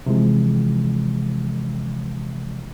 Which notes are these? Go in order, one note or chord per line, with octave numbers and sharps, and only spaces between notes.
C3 E3 F3 G#3